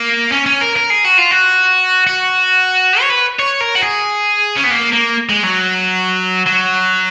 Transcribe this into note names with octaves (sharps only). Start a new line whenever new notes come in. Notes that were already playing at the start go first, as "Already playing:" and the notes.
Already playing: A#3
C#4
C#4
A#4
A#4
G#4
F#4
F4
F#4
F#4
C#5
B4
C#5
A#4
F#4
G#4
C#4
B3
A#3
A#3
G#3
F#3
F#3